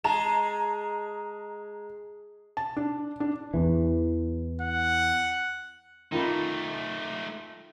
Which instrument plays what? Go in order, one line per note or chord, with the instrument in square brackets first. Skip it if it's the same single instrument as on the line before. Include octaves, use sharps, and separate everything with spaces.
[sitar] G#3 [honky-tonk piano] A5 A#5 E7
[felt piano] A5
D4
D4
[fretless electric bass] E2 E3
[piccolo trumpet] F#5
[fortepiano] D#3 F4 B5 [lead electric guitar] A3 D#4